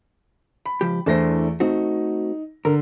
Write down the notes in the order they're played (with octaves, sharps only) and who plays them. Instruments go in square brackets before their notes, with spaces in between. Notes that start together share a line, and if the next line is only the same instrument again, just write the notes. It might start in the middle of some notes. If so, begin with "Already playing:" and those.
[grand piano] B5
[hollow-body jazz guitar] C#2 F3 G4
[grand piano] E2 A3 A#6 [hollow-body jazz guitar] D4 E4 C5
[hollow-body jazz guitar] A3 C4 F#4 [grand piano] D#4
[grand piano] D3 [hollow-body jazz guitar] A#4